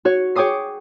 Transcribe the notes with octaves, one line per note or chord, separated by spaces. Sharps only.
F#4 C#5
G#4 C#5 G5 D6 D#6 C7